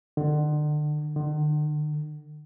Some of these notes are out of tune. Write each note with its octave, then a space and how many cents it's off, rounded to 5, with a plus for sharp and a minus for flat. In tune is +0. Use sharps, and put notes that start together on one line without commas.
D3 +35
D3 +45